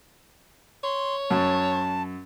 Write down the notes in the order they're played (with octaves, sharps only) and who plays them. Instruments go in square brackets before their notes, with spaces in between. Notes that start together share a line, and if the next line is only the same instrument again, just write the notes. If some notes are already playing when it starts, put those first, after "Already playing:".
[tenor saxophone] C#5 [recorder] C6
[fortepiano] F#2 [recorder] A5